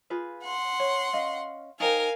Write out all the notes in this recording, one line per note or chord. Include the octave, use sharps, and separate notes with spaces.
F4 G#4 B4
F#5 C6
C#5
C#4 D#5 F5
D#4 A#4 C5 F5 G5 G#5